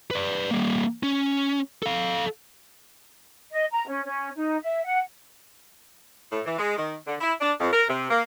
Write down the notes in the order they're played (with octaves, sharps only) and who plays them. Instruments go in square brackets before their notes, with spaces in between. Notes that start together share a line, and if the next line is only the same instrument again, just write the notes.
[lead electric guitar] B4 D5
G3 A#3
C#4
A4 F5
[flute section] D#5
A#5
C#4
C#4
D#4
E5
F#5
[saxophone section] A2
E3
G#3
D#3
D3
E4
D4
F2
A#4
C3
A#3